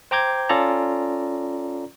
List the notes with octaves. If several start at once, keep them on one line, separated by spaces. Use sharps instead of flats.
C5 G5 A#5 D6 G6 G#6
C#4 F4 A4 D5 A#5